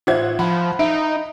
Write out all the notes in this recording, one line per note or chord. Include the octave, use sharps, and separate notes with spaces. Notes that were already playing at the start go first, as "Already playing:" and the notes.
A1 F4 C5 E5 F#5 G#6
F3 F#5 B5
D#4 E5 D7